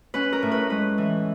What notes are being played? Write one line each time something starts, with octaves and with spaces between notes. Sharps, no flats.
C#4 B4
A#4
A2
B4
G#3 B4
E3